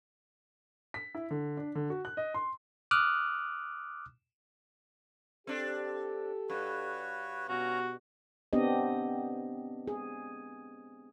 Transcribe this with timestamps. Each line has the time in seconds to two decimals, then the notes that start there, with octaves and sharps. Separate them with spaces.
0.94 B6
1.15 E4
1.31 D3
1.57 D4
1.75 D3
1.90 F#4
2.05 F#6
2.17 D#5
2.34 C6
2.91 D6 D#6 F6 F#6
5.47 C4 D4 G4 A4
6.50 G2 F#4 B4 C#5
7.49 B2 C#4 F#4 A#5
8.53 B3 C4 D4 G4 D#5
9.88 G#4